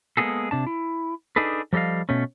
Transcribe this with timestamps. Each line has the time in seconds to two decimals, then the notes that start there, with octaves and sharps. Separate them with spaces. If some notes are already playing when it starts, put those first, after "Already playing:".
0.17 G#3 A#3 B3 F#4 G#4 A4
0.51 C3 D4 A5
0.67 E4
1.36 D4 D#4 G#4 A4 B4
1.73 F3 G3 A4 D#5 F5
2.09 B2 A3 C#4